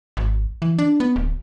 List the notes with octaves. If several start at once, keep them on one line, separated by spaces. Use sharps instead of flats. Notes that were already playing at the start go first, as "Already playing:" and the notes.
G#1
E3
D4
B3
D1